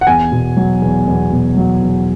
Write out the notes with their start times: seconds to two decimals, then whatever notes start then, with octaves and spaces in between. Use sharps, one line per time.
0.01 F#5
0.07 E2 G#5
0.32 B2
0.57 F#3
0.82 E2
1.07 E2
1.31 B2
1.57 F#3
1.82 E2